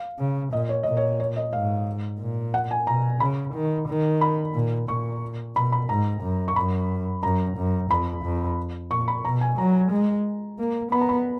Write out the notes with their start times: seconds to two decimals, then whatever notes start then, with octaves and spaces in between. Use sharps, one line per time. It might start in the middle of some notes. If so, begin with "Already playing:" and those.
Already playing: F5
0.19 C#3
0.53 A#2 D#5
0.69 C#5
0.83 A#2 D#5
0.97 C#5
1.20 C#5
1.36 D#5
1.53 G#2 F5
2.20 A#2
2.54 F#5
2.71 G#5
2.87 B2 A#5
3.20 C#3 B5
3.54 D#3
3.88 D#3
4.21 B5
4.54 A#2
4.88 A#2 C#6
5.56 B2 B5
5.72 B5
5.89 G#2 A#5
6.22 F#2
6.48 C#6
6.56 F#2 B5
7.23 F#2 A#5
7.57 F#2
7.90 F2 B5
8.24 F2
8.91 A#2 C#6
9.08 B5
9.25 B2 A#5
9.41 G#5
9.58 F#3 A#5
9.91 G#3
10.59 A#3
10.92 B3 B5
11.01 A#5
11.09 B5